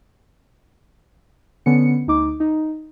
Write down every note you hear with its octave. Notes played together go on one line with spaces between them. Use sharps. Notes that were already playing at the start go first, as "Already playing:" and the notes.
D3 B3 C#4 C#7
D2 D#4 D6
D#4